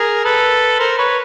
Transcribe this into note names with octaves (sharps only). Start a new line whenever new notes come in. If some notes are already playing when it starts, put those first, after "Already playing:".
Already playing: G#4 A#4
A4 B4
A#4 C5
B4 C#5